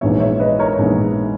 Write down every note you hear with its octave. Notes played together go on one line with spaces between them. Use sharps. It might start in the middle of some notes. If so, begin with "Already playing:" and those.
A#1 G#2 E3 B3 C#5 E5
C#5 E5
B4 D#5
A#4 C#5
A#1 G#2 E3 B3